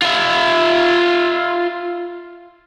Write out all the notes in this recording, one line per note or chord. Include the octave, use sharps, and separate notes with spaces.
F4 E5